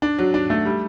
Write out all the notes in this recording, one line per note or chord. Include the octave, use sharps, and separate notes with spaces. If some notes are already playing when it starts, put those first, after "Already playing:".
D4
F#3
D4
A3
G3